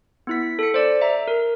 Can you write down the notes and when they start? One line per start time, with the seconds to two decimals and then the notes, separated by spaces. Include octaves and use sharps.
0.27 B3 E4 B6
0.59 A4 C#7
0.74 C5 D5
1.01 E5 A#5
1.28 A#4